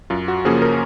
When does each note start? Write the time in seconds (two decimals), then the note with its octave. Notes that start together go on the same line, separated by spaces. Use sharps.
0.10 F#2 F4
0.28 F#4
0.45 C#3 F3 A#3 C#4 G#4
0.62 A#4